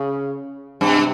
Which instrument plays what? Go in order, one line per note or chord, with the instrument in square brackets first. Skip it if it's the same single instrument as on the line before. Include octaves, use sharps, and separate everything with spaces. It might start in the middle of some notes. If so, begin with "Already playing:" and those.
Already playing: [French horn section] C#3
[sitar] G2 [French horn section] C3